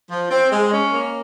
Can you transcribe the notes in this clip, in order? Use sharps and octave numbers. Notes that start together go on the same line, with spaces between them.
F3
C4
G#3
C#4
A#3